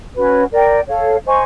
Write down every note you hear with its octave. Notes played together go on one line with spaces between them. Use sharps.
C#4 F#4 B4
A#4 D5 G5
A4 C#5 F5
C5 D#5 G#5 C#6